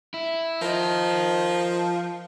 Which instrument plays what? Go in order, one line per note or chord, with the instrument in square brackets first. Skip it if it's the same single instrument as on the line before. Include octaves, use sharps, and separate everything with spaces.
[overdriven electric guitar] E4
[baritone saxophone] F3 [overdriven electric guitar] A#4 D#5